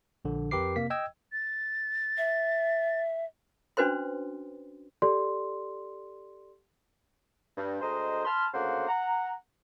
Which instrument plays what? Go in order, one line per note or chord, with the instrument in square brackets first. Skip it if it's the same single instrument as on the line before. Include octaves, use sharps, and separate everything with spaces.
[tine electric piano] A#1 D3
F2 G4 A#4 B4 D6 C7
C3 A#3 B6
D#5 G5 E6 G#6
[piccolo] A6
[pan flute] E5
[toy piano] C#4 D4 F#4 B4 C5 C6
[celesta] G4 A4 D5 C6
[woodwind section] G2
D2 G#3 C5 D#5 A#5
A5 B5 C6 F6
D2 C#3 A#3 C5 F#5
F#5 A#5